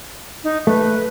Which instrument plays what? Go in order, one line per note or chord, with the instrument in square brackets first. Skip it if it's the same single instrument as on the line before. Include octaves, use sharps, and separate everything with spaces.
[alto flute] D#4
[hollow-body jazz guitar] A3 [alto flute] B4